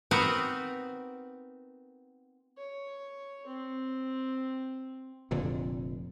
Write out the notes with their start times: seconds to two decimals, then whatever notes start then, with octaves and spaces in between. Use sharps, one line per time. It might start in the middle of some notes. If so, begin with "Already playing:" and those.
0.11 B3 C4 D#4 F#4 A#4 B4
2.57 C#5
3.47 C4
5.31 F1 F2 A#2 D3